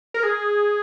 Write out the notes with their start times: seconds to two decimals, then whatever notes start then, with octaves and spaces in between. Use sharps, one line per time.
0.14 A#4
0.23 G#4